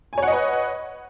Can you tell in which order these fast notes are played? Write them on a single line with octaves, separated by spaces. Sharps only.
G#5 C#5 F#5 D#5 B4